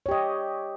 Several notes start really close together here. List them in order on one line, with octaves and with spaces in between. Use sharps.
C#5 G4 D#5